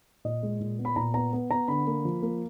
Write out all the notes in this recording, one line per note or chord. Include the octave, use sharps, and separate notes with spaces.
A#2 D#5
G#3
A#2
B3
B5
A#2 A#5
B3 A#5
B3
B3 A#5
D3 B5
A#3
F3
A#3